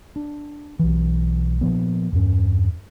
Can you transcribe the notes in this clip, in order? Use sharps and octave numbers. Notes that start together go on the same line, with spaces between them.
D4
B1 E3
A#2 F3 B3
E2 G2 C#4